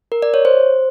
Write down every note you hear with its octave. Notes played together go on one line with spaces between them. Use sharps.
A#4
D5
C#5
C5